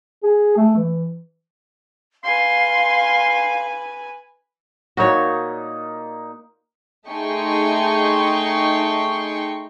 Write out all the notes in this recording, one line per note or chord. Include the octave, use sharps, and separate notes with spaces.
G#4
A3
E3
B4 F5 G#5 C6
A#2 D#4 F#4 C#5
A3 D#4 G#4 G5 C6 C#6